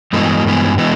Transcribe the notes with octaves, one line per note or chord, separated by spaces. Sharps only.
G2 E3 G#3 B3
G2 E3 G#3 B3
E3 G#3 B3